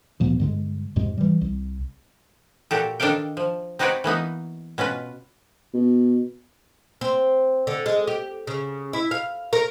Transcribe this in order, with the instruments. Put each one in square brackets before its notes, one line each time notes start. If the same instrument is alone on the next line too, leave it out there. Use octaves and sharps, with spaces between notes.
[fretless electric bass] D2 A#2 F3 B3
G2 D3 G#3
F2 G#2 C3 G#3
E3 G3
C2
[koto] A#2 F#4 G4 A4
D#3 D4 A4 D5 F5 G5
F3
C4 D#4 F#4 B4 C#5 D5
E3 A#3 B3 D#4
B2 C#4 F4 B4
[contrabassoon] B2
[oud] C4
D3
G#3
G4
C#3
E4
F5
A#4